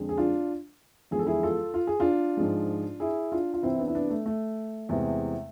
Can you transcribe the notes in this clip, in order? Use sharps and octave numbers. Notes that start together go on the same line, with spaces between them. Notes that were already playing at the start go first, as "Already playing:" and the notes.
Already playing: F2 D3 G#3
G#4
D4 F4
E2 D3 F3 G#3 G#4
A4
E4 G#4
F4 A4
F4
G#4
D4 F4
G#2 F3 G#3
E4 G#4
D4 F4
F4
C2 C3 E3 C4 E4
B3 D4
E4
B3 D4
A3
A3
E2 C3 E3 G#3